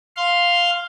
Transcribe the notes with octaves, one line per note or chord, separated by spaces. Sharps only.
F5 C6